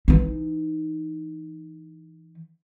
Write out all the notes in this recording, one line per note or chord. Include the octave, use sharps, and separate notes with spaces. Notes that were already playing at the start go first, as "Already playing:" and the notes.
E3 D#4